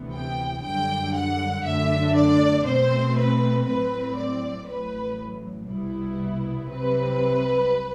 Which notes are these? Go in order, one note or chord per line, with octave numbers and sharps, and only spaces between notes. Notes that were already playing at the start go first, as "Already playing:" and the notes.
Already playing: D2 C3 E3 B3
G5
F#2 D3 G3 G5
F#5
F#2 D3 A3 D4 E5
D5
B2 A3 C4 C5
B4
A2 F#3 C4 B4
D5
A1 A2 F#3 B4
C2 B2 G3 B3 E4
C2 C3 F#3 C4 B4